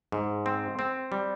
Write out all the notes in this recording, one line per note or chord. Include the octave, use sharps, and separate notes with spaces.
G#2
C4
C4
G3